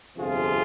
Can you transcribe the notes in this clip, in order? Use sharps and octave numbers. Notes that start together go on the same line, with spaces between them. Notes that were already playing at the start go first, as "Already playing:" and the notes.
G1 F2 C3 F3 F4 G#4